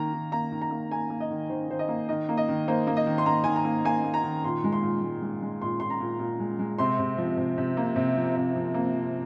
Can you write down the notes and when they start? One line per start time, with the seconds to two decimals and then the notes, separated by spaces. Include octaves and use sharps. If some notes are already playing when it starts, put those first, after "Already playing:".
Already playing: D#3 A#3 A#5
0.13 D#3
0.32 A#3 A#5
0.52 D#3
0.61 A#5
0.71 A#3
0.91 A#3 G#5
1.10 A#3
1.21 D#5
1.30 D#3
1.49 D#3 C5
1.69 D#3 C5
1.79 D#5
1.88 A#3
2.09 D#3 D#5
2.29 A#3
2.37 D#5
2.48 D#3
2.68 A#3 C5
2.87 A#3
2.97 D#5
3.06 D#3
3.18 C6
3.26 A#3 A#5
3.44 D#3 G#5
3.56 A#5
3.65 A#3
3.85 A#3 G#5
4.04 A#3
4.14 A#5
4.23 D#3
4.44 A#2 C6
4.64 G#3
4.72 C6
4.83 A#2
5.03 G#3
5.22 G#3
5.42 G#3
5.62 A#2 C6
5.80 A#2 C6
5.90 A#5
6.00 A#2
6.19 A#2
6.39 G#3
6.59 G#3
6.78 C3 C6
6.99 C3
7.17 F3
7.37 C3
7.58 C3
7.77 A#3
7.96 C3
8.17 F3
8.36 C3
8.56 F3
8.74 A#3
8.94 F3